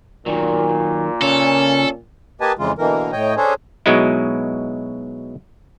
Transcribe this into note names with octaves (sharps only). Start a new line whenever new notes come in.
A#2 D#3 F#3
C#3 C#4 A4 C#5
A#3 G4 B4 D#5 G#5 A5
F2 C#3 E3 G#3 F4
B2 D3 E3 A#3 A#4
A2 C#5 D#5 G5
C#4 D4 G#4 A4 C5 C#5
B2 F#3 G#3 D#4 E4